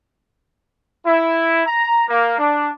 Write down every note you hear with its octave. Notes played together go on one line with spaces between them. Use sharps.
E4
A#5
A#3
D4